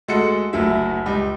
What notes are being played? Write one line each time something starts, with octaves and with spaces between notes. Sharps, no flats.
D2 G#3 F#4 A4 C#7
F#1 D2 F#3 E5
C#2 G3